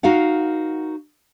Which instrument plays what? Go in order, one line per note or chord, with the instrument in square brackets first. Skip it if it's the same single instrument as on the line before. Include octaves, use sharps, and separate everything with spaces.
[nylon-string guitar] D#4 F#4 A#4 F5 F#5